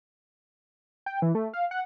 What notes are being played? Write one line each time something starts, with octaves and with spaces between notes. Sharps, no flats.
G5
E3
A3
F5
F#5